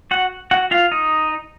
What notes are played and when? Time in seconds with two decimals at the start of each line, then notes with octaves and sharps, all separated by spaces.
0.11 F#4 F#5
0.51 F#4 F#5
0.71 F4 F5
0.91 D#4 D#5